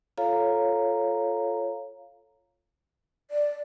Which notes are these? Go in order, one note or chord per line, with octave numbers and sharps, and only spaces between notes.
F4 A4 C#5 F5 A#5
D5